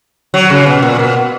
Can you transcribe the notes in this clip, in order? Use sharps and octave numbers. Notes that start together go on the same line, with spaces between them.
F#3
C#3
B2
A#2
B2